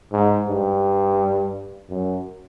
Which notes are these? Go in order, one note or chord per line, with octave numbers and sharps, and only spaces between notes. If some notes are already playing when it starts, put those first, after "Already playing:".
G#2
G2
F#2